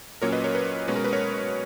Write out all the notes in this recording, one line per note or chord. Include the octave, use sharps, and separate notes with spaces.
A#2 F#3 A#3 C#4 A#4 C#5
B4 D#5
A#4 C#5
B4
B2 G#3 C#4 B4
A#4
B4
A#4 C#5